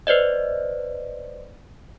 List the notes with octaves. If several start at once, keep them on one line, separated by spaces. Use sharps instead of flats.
B4 C5 D5 D#5